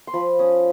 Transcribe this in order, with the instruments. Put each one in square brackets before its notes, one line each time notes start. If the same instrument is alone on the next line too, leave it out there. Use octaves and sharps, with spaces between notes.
[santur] C6
F3 B5
C#4 D#6